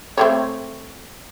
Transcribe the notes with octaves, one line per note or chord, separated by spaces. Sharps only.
A3 C4 C#5